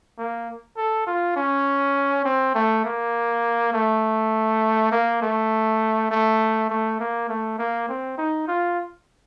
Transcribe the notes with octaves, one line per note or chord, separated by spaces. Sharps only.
A#3
A4
F4
C#4
C4
A3
A#3
A3
A#3
A3
A3
A3
A#3
A3
A#3
C4
D#4
F4